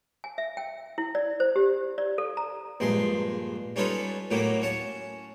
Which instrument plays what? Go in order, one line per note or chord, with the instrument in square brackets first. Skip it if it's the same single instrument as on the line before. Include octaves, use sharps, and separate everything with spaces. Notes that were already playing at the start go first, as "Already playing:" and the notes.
[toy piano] G#5
E5
G5
E4
D5
C5
G4
D5
A4
A#5
[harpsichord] A#1 G2 G#3 C6
G3 C#4 D#4 F4 A4 B4
A2 F#3 A#3 G4
C#4 F#5 A5